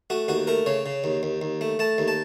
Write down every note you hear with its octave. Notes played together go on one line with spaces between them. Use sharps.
A3 F#4
D#2 F#4
A3 A#4
C#3 C#5
C#3
D#2
D#2
D#2
A3
A3 A5
D#2
A5